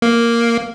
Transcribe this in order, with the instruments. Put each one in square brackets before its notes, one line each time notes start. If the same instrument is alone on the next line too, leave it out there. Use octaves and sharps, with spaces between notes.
[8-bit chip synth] A#3